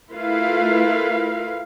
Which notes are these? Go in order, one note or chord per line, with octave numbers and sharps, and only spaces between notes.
A3 E4 F4 A#4 B4 F5